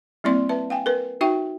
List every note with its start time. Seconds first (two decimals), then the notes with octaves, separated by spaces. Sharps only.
0.24 G3 A#3 C4 E4 D5 C6
0.49 B4 E5 A5
0.70 F5 G5 G#5
0.86 A#4 B4
1.21 D#4 F#4 E5 G5 C#6